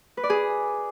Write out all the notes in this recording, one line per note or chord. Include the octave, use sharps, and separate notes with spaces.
B4
D5
G#4